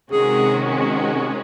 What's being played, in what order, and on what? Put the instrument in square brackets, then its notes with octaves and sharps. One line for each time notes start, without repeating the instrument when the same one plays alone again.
[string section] C3 D#3 G#3 C#4 F#4 [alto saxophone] G#4